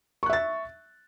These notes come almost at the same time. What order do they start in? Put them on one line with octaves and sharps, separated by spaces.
C#6 F#6 E5 A6